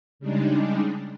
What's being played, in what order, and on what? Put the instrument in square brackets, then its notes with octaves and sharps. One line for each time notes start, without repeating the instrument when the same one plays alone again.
[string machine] C#3 G3 G#3 D4 D#4